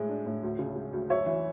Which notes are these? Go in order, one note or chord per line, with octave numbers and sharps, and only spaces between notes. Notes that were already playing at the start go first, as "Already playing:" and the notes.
Already playing: A2 G#3
D4
A2
D2
C#3
G#3
D2
F#2 C#5 E5
E3